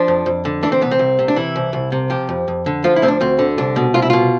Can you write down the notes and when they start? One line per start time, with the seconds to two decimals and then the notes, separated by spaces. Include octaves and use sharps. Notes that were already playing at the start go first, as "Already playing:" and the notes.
Already playing: F3 D4
0.08 F2
0.26 F2
0.45 D3
0.63 E3 D4
0.72 C4
0.81 C2 B3
0.91 C4
0.99 C2
1.19 C3
1.28 D4
1.36 E3 E4
1.56 C2
1.73 C2
1.92 C3
2.10 F3 G4
2.29 F2
2.48 F2
2.66 D3
2.84 F3 F4
2.96 E4
3.02 D2 C4
3.08 D4
3.21 D2 C4
3.39 D3
3.58 C2 D4
3.76 B2
3.94 C2 F4
4.02 E4
4.10 B2 F4